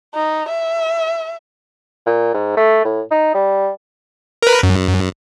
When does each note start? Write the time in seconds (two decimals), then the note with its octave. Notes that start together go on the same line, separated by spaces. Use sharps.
0.15 D#4
0.49 E5
2.06 A#2
2.34 G#2
2.57 A3
2.85 A2
3.11 D#4
3.34 G3
4.43 A#4 B4
4.63 F#2